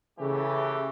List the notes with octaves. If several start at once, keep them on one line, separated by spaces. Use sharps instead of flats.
C#3 E3 A3 G4